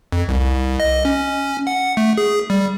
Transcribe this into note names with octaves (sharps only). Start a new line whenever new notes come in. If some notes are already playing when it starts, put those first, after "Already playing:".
F2
C2
D#5
C#4
F#5
A3
G#4
G3